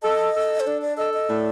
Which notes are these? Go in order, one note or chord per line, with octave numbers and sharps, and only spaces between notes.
A4 D#5
A4
C5
D4 D5
D5
A4 D#5
D#5
A2 D5